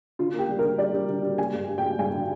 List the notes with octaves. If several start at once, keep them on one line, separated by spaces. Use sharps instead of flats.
D3 F4
A#3
G4
G3
D3 A#4
G3 D5
G3
D3
G3
G3 G#5
G2
G2
G5
G3
G2 G#5
D3